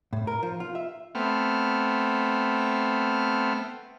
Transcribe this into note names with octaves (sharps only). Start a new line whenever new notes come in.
A2
A#4
F3
F4
E5
A3 B3 C4 F6